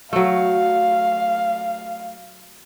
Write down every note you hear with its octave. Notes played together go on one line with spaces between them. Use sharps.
F#3 A3 F5